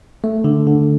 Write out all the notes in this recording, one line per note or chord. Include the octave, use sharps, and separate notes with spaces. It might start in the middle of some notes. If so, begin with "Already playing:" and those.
A3
D3
D3